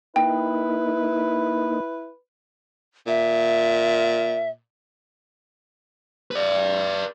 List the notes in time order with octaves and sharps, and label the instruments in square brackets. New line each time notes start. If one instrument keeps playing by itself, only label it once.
[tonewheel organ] A#3 D#4 [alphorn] E4 [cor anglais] B4 [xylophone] G5
[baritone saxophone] A#2 [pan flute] E5
[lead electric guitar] B4 D5